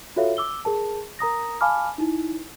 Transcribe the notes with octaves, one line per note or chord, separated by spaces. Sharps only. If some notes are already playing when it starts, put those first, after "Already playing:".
F4 F#4 A4 C#5 E5 F5
D6 E6 G7
G#4 A#4 A5
A#4 A#5 D#6 A#6
F5 G#5 A5 B5 D6 F6
D#4 E4